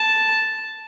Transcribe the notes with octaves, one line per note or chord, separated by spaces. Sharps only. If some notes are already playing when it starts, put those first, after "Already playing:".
Already playing: A5